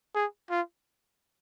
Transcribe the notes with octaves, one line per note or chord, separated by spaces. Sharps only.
G#4
F4